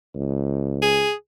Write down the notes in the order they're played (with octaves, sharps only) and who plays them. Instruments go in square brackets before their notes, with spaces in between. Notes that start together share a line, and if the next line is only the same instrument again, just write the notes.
[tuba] C#2
[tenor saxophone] G#4